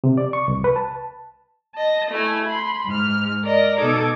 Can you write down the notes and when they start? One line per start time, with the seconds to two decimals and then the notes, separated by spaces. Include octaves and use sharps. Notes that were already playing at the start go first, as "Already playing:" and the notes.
0.04 C3
0.17 D5
0.33 C#6
0.48 C2
0.64 B4
0.76 A5
1.75 D#5 A5
2.10 A3 E4 G#5
2.46 B5 C6
2.86 G#2 F6
3.44 A#4 D5 D#5
3.78 B2 D#4 A4 D6 G#6